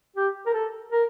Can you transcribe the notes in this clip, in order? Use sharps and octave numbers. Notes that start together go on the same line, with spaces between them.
G4
A#4
A4
A#4